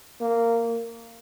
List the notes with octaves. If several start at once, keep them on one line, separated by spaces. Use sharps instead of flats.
A#3